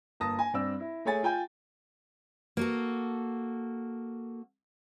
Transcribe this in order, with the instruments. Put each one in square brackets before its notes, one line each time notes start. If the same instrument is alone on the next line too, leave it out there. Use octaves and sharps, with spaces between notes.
[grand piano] G1 A#3 A5 D#6 A#6
G#5
G2 C4 D5 E6
E4
A3 G#4 C#5 G#5 A6
F4 G5 G#5 G6
[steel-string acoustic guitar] A#3 F#4 A4